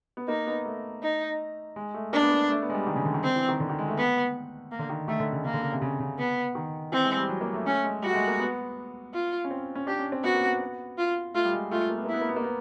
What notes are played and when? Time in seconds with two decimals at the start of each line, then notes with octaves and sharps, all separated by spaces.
0.17 B3
0.28 A#3 D#4
0.47 B3
0.66 A3
1.03 D#4
1.76 G#3
1.94 A3
2.13 A#3 D4
2.22 B3
2.31 A#3
2.50 A3
2.62 B3
2.70 G#3
2.74 G3
2.87 D#3
2.96 C#3
3.05 D3
3.14 D#3
3.23 C4
3.36 E3
3.49 D#3
3.60 D3
3.69 D#3
3.79 G#3
3.88 A3
3.98 B3
4.72 A#3
4.79 D3
4.90 D#3
5.08 D#3 A3
5.20 D3
5.32 C#3
5.45 C#3 A#3
5.54 D3
5.63 C#3
5.72 C3
5.82 C#3
6.00 C#3
6.18 B3
6.55 D#3
6.92 E3 C4
7.04 G#3
7.16 G3
7.29 F#3
7.41 A#3
7.54 A3
7.66 A3 C#4
7.84 G#3
8.02 G3 F#4
8.10 A3
8.15 G#3
8.27 A#3
8.40 B3
9.14 F4
9.44 C#4
9.51 C4
9.75 C#4
9.87 D4 G4
9.99 C#4
10.12 C4
10.24 B3 F#4
10.35 A#3
10.45 B3
10.98 F4
11.34 A3 F4
11.45 G3
11.53 G#3
11.71 A3 F4
11.90 A#3
11.98 B3
12.05 A#3
12.09 E4
12.14 B3
12.21 A#3
12.29 B3
12.36 A#3
12.44 B3